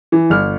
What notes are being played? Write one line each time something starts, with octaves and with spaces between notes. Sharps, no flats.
E3
G1 F6